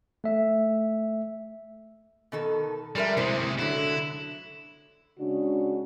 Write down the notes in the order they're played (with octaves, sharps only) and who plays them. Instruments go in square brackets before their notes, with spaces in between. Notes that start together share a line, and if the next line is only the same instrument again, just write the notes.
[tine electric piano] A3 E5
[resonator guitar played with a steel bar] B2 D#3 A4
[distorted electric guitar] G3 [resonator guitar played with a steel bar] G#3 A#4 E5
[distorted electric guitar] C3 G#3 [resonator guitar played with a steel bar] E4 C5
[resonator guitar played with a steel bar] D3 F#3 [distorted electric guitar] E4
[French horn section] C#3 G#3 D4 F#4